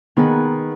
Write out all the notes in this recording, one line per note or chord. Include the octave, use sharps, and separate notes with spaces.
D#3 B3 D#4 G#4 B4